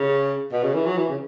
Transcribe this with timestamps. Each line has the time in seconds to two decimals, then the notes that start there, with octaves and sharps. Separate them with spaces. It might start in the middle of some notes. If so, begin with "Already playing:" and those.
Already playing: C#3
0.52 B2
0.63 C#3
0.74 E3
0.86 F#3
0.97 E3
1.09 C#3